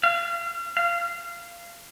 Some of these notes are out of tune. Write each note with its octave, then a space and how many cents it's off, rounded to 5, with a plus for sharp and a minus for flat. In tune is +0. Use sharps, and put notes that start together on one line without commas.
F5 -35
F5 -20